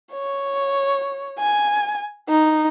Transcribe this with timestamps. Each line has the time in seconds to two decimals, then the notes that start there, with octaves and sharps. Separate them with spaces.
0.12 C#5
1.39 G#5
2.29 D#4